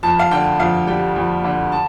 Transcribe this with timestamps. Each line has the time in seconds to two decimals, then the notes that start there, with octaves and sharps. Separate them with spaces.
0.03 F2 A5
0.19 F5
0.31 D3 G5
0.60 F2 F5
0.87 G3 G5
1.16 F2
1.44 D3
1.72 A5